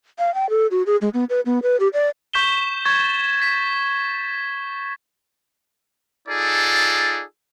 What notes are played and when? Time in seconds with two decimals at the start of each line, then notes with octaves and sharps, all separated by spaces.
0.19 F5
0.34 G5
0.50 A4
0.71 F#4
0.86 G#4
1.02 G#3
1.14 B3
1.30 B4
1.46 B3
1.63 B4
1.80 G4
1.93 D5
2.33 C#6 G6 B6 E7 G7
2.85 C#6 G#6 A6
3.40 A6 B6
6.28 D#4 F4 G#4 A4 D5